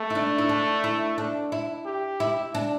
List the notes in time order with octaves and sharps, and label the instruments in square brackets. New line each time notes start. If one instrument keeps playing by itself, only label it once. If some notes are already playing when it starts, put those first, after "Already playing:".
Already playing: [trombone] A3
[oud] E4
D4
E4
D4
E4
D4
E4
[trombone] G4
[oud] E4
D4